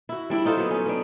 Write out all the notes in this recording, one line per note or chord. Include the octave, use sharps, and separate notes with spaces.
E4 F#4
G3 D4 E4
D#4 F4 A4 C5
F#3 B3
C#4 D#4
B3 D4